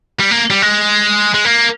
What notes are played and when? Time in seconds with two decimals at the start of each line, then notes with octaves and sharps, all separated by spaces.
0.20 G3
0.31 A#3
0.50 G3
0.62 G#3
1.34 G#3
1.45 A#3